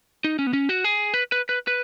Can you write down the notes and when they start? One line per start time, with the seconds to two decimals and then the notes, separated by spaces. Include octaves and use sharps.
0.24 D#4
0.39 C#4
0.47 B3
0.53 C#4
0.69 F#4
0.84 G#4
1.14 B4
1.32 B4
1.49 B4
1.67 B4